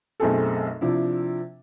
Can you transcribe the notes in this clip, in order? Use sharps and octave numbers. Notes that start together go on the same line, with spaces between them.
B1 F#2 A3 C4 G#4 A4
C3 F3 D4 E4